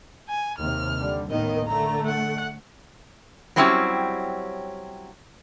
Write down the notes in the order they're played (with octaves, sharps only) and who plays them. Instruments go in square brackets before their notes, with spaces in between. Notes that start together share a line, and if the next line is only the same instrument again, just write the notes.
[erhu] G#5
[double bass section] D#2 C3 [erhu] F6
[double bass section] D3 G3
[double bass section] A1 D#2 [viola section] D#3 B3 [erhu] D#5
[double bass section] D3 [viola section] A3 [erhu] A#5
[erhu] F#5
[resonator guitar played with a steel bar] F#3 G3 C4 C#4 E4 G4